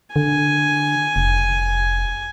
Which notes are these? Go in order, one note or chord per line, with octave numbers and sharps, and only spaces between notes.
D3 G#5
F1